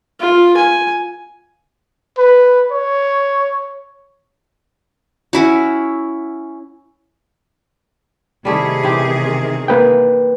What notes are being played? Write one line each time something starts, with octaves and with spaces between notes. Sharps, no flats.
F4
G#5
B4
C#5
C#4 E4 F#4
C3 D#3 G3 A3 E4 G#4
E3 C4 G4
A#3 B4 G5